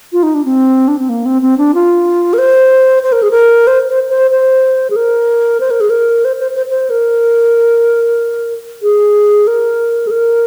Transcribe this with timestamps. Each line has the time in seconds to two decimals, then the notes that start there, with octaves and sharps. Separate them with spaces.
0.13 F4
0.23 D#4
0.35 D4
0.45 C4
0.88 D4
0.99 C4
1.09 A#3
1.26 C4
1.42 C4
1.58 D4
1.74 F4
2.33 A#4
2.38 C5
3.03 C5
3.12 A#4
3.22 G#4
3.31 A#4
3.67 C5
3.89 C5
4.09 C5
4.31 C5
4.90 G#4
4.96 A#4
5.60 C5
5.70 A#4
5.81 G#4
5.90 A#4
6.25 C5
6.40 C5
6.55 C5
6.69 C5
6.90 A#4
8.83 G#4
9.47 A#4
10.07 G#4
10.11 A#4